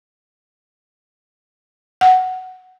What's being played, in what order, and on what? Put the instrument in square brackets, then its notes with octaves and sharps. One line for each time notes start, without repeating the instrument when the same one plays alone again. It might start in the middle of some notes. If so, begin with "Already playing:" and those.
[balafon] F#5